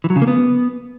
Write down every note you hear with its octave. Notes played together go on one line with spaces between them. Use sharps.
E3
F#3
C#3
A#3
B3